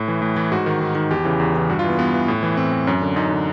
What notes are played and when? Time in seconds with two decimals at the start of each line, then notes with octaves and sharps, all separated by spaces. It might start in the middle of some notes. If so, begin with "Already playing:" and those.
Already playing: A2
0.08 E3
0.22 A2
0.37 E3
0.52 G#2 F#4
0.66 D#3
0.81 G#2
0.95 D#3
1.10 E2 G4
1.25 C#3 E3
1.40 E2
1.55 C#3 E3
1.70 G2 F#4
1.79 F4
1.84 E3 B3
1.99 G2 B3
2.14 E3
2.28 A2
2.43 E3
2.57 A2 C4
2.72 E3
2.87 F#2 C#4
3.02 D3
3.16 F#2 D#4
3.31 D3